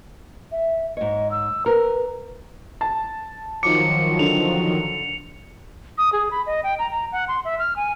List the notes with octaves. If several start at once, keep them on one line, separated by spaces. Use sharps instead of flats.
E5
G#2 C#5 D#5
E6
A#4 B4
A5
D#3 F3 F#3 D6 C#7
D3 F7
D#6
G#4
B5
D#5
G5
A#5
A#5
F#5
C6
E5
F6
G#5